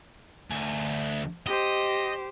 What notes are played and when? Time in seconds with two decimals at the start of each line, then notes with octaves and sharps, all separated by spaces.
0.50 D2 G#5
1.46 G4 C5 D#5